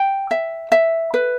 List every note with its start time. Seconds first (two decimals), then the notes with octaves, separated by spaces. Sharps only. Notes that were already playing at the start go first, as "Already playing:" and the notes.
Already playing: G5
0.31 E5
0.72 E5
1.14 B4